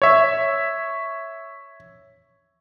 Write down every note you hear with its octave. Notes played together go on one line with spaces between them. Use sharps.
C#5 E5